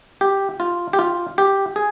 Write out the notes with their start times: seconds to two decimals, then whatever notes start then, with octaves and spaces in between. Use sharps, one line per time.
0.21 G4
0.60 F4
0.93 G4
0.99 F4
1.38 G4
1.76 G#4